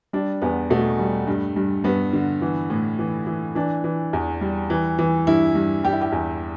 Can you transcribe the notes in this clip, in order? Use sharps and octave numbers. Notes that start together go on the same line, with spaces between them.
G3 D4
E2 B3
B2 A3
G3
G2
G2
G2 B3
D3
E3
A2
E3
E3
E3 D4
E3
E2
G3
E3
E3
G2 E4
G2
G3 G4
E4
G4
E2